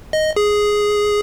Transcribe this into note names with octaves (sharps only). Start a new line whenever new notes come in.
D#5
G#4